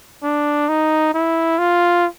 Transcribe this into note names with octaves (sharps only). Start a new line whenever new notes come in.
D4
D#4
E4
F4